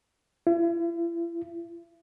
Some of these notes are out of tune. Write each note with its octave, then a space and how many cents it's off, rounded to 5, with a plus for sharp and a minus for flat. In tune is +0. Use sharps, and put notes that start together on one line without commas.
E4 +40